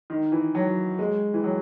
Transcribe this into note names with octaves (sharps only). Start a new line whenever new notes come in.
D#3
E3
F#3
G#3
E3
F#3